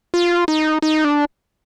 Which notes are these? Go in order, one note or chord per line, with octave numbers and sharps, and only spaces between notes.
F4
D#4
D#4
D4